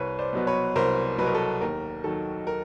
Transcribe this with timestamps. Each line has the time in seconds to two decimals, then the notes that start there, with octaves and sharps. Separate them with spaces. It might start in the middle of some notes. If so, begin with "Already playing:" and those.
Already playing: C2 B4 C#5
0.19 C5 D5
0.33 B2 F#3 B3
0.47 B4 C#5
0.76 C2 A#4 C5
1.18 B2 F#3 B3 B4
1.26 A#4
1.34 A4 B4
1.61 D#2 A#4
2.04 D#3 F#3 A4
2.47 A#4